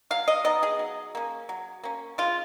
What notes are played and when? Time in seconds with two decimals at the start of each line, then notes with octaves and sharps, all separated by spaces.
0.11 F#3 F5
0.28 D#5
0.45 B3 D#4 D#5
0.63 G#4
0.79 F#3
1.15 A#3 C#4
1.49 F#3
1.83 A#3 C#4
2.18 C#3 F4